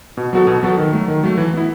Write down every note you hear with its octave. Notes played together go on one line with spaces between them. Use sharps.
B2
F#3 B3 F#4 A4
B2
F#3 B3 F#4 A4
D#3
F#3 A3
D#3
F#3 A3
E3
B3 E4